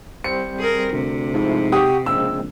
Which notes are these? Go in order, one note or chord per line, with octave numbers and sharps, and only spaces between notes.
G3 C4 C5 C#7
G#4 A#4
D2 C3
G#2 F3 A3 E4
G4 F#5 C#6 D#6
A#1 C#3 G#3 C4 E6